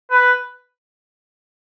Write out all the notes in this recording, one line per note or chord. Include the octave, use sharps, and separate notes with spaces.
B4